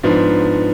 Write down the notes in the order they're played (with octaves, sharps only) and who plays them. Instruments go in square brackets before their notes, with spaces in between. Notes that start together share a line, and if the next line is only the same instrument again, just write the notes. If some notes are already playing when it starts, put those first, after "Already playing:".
[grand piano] G#2 F3 B3 D4